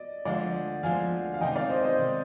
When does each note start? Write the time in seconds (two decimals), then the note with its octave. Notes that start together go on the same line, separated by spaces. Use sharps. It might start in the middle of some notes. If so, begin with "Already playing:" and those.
Already playing: D5 D#5
0.25 D2 D3 F3 G#3 D5 F5
0.83 D2 D3 F3 G#3 F5 G#5
1.34 F5
1.41 C3 D#3 G#3 D#4 D#5 G5
1.56 D5 F5
1.69 C5 D#5
1.84 C5 D#5
1.98 C3 D#3 G#3 D#4